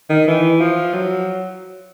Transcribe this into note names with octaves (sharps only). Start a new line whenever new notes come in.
D#3
E3
F3
F#3